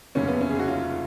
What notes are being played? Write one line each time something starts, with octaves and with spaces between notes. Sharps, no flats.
F1 D#2 C#3 F#3 C#4
B3
C#4
G#4
F#4
F4